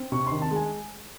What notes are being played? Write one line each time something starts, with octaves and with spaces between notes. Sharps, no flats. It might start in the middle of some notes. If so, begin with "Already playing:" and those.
Already playing: C4
C3 C#6
D#3 C6
A5
G#3
G#5